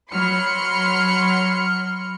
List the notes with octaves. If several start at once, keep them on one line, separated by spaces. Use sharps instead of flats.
F#3 B5 C6 F6 C#7